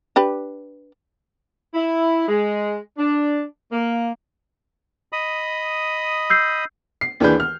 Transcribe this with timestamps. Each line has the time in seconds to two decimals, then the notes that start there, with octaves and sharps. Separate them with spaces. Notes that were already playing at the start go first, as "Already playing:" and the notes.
0.16 D4 G4 B4
1.74 E4
2.28 G#3
2.97 D4
3.71 A#3
5.12 D#5 B5 D#6
6.30 E6 G6 C7
7.01 C7
7.20 D#2 E3 D4 G#4 B4 G6
7.40 F6